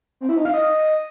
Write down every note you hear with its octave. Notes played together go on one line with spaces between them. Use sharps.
C4
E4
D#4
F5
D#5